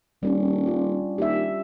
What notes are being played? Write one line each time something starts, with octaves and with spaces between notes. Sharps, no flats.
D#1 G3 C#4 D4
F4
D#2 G4 E5